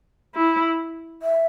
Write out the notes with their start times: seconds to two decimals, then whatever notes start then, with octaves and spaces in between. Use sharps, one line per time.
0.35 E4
1.22 E5